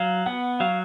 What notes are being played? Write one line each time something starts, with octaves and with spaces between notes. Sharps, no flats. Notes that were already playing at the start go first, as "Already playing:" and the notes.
Already playing: F#3 F5
B3 F#5
F#3 F5